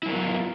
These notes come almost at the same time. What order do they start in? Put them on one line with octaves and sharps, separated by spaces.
E4 F#3 A#4 B3 F4